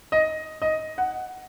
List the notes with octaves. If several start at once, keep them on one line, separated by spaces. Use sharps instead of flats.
D#5
D#5
F#5